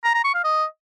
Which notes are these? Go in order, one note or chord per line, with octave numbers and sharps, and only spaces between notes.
A#5
A#5
C#6
F5
D#5